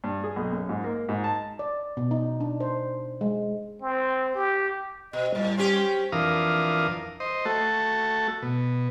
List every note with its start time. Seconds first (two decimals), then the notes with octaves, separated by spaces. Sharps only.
0.04 G2
0.24 G#4
0.36 B1
0.52 F#2
0.69 G#2
0.84 A#3
1.09 G#2
1.24 A5
1.59 D5
1.97 B2
2.11 D#4
2.40 D4
2.60 C5
3.21 G#3
3.82 C4
4.35 G4
5.13 B2 D#5
5.35 A2 G3
5.57 C4 C#4 G4
6.12 F2 E3 D4 A#4 F5 D#6
7.20 C5 D#5
7.45 A3 F#4 A4
8.42 B2